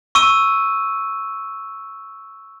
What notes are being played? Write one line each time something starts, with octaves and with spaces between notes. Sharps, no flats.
C#6 E6 D#7